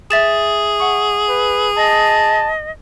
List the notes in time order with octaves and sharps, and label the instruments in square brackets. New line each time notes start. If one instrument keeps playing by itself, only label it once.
[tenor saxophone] G#4 [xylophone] E5 A6 E7
[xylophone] F#5 C#6
[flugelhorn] B4
[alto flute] D#5 [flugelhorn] A5